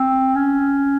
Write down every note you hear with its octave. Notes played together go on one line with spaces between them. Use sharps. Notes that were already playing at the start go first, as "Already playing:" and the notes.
Already playing: C4
C#4